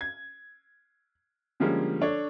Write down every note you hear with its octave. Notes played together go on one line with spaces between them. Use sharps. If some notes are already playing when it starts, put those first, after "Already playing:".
G#6
D3 F3 G3 G#3 A#3 C#4
D4 A4 C#5